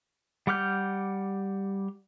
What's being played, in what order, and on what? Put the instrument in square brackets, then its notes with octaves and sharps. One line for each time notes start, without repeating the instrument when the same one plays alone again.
[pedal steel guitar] G3 F#5 D6 F6 G6